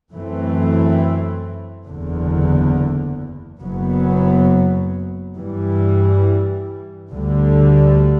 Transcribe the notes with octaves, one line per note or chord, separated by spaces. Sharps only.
F#2 E3 A3 C4
F#1 E2 D3
F#1 F#2 F#3 B3
G2 E3 G3
D2 D3 G3